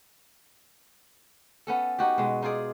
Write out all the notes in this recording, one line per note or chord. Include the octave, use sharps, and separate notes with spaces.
B3 C#4 A4
D#4 F#4 G4
B2 G#3
D#4 F4 G#4 D5